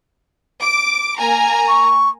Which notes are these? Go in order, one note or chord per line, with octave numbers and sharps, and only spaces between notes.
D6
A#3 G#5 A#5
C#6